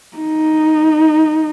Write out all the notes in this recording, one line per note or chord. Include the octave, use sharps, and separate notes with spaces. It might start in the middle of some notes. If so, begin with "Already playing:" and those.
D#4